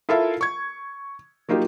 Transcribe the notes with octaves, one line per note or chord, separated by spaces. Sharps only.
E4 F4 A4 A#4 E5 F5
C#6 G#6
F#3 A#3 D#4 F4 G4